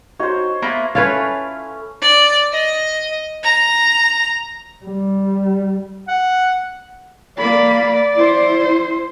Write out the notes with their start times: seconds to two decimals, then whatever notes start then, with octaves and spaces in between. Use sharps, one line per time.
0.19 D#4 F#4 C5 C#5 D#5
0.62 A#3 B3 E4 B5
0.95 A3 C#4 E4 F4 B4 C#5 F5
2.01 D5
2.52 D#5
3.43 A#5
4.85 G3
6.08 F#5
7.38 A#3 D5 B5
8.15 E4 C5